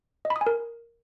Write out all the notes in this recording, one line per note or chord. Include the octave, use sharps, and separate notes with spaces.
D#5
B5
D#6
G#5
A#4